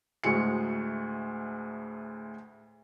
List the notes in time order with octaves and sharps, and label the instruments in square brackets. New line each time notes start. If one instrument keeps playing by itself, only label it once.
[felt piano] D2 A2 G#3 C#7